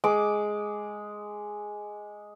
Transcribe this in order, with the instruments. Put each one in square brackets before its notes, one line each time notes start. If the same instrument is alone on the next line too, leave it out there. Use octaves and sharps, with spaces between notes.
[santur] G#3 D6